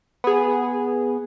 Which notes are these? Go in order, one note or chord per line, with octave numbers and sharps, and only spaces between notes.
B3 G#4